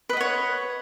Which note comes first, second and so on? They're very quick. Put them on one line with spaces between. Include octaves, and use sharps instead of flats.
B4 D#5 F#5 C#5